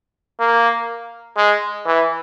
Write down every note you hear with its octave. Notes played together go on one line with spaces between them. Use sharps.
A#3
G#3
E3